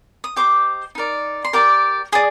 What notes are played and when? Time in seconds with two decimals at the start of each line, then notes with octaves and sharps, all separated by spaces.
0.24 D#6
0.36 G4 C5 D#5 D6
0.95 D#4 A#4 D5
1.44 C6
1.53 G4 A#4 D5 D6
2.12 G#4 D5 D#6